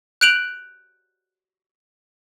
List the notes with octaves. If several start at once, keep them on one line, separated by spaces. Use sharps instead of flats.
F#6 G6 D7 F7 F#7